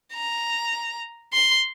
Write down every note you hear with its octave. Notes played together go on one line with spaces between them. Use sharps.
A#5
C6